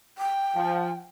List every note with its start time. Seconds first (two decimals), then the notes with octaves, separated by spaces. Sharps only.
0.18 G5
0.55 F3